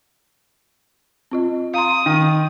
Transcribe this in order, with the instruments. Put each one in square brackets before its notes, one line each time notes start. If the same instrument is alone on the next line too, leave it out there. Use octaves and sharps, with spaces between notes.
[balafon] C4 F4 D#5
[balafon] F5 A#5 C6 [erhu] D#6
[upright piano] D#3